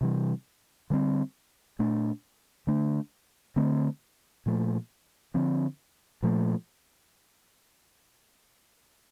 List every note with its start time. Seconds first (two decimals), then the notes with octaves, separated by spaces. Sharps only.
0.01 C3 E3 G3
0.90 D3 G3 C4
1.79 A#2 A3 D4
2.67 D3 A3 D4
3.56 D3 A3 C4
4.46 A#2 F3 A3
5.34 D3 F3 C4
6.23 A#2 F3 A3